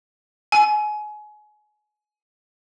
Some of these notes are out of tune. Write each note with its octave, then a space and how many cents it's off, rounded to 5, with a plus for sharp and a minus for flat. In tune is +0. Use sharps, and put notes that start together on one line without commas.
G#5 +25